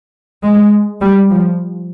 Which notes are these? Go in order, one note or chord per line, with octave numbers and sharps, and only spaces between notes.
G#3
G3
F3